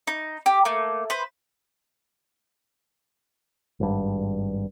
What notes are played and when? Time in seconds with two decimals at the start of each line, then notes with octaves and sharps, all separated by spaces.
0.07 D#4
0.46 G4
0.65 A3 A#3
1.10 B4 C5
3.80 G#1 G2